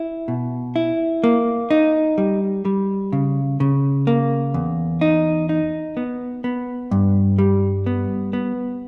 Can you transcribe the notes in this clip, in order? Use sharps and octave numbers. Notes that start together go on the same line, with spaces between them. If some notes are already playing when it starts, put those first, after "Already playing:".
Already playing: E4
B2
E4
A#3
D#4
G3
G3
C#3
C#3
A#3
E2
D#4
D#4
B3
B3
G2
G3
B3
B3